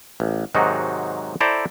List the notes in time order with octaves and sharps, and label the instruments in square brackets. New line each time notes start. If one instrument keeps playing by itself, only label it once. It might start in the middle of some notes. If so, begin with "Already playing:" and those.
[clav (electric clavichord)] A1
G#2 C3 D#3 F#3 D#4 F#4
E4 A4 C5 D5 G5 A#5